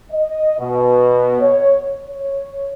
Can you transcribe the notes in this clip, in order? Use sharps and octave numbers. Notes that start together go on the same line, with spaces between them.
D#5
B2
C#5
C#5